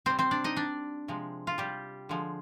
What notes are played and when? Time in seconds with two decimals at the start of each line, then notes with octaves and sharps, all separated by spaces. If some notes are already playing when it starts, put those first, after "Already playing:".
0.06 C3 G3 C4 C5
0.19 C4 C5
0.31 D4 D5
0.44 D#4 D#5
0.57 D4 D5
1.08 C3 F3 G#3
1.47 F4
1.58 G3 G4
2.09 D3 F3 G#3